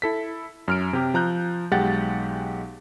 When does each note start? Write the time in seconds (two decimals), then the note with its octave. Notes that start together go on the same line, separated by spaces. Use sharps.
0.02 E4 A4 B6
0.68 F#2 F6 D7
0.93 C3 G4
1.14 F3 A#5 F#6 G6
1.71 B1 G#3 G4 F#5 G6 A6